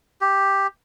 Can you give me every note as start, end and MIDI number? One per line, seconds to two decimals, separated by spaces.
0.21 0.67 67